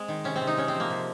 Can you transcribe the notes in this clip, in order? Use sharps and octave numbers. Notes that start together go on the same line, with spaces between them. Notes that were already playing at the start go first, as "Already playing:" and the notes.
Already playing: G#3 C4
D#3
C3 C#4
C4
C3
D#4
G#3 C#4
C4
F3
A#3
C3